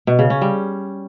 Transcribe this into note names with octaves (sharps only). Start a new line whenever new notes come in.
B2
C#3
C#4
G3